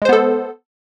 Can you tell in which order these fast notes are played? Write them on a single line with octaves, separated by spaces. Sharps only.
G#3 C5 B3 A4